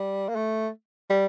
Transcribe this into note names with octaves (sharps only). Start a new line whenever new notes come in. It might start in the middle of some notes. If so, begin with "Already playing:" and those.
Already playing: G3
A#3
A3
G3